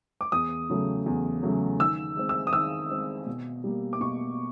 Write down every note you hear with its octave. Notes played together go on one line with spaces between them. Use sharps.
D6
E2 D#6
C#3 F#3 A3
E2
C#3 F#3 A3
D#3 E6
G#3 C4
E6
D#6
D#3 E6
G#3 C4
B2
G3 A#3
D6
B2 C#6